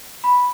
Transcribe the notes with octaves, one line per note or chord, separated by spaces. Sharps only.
B5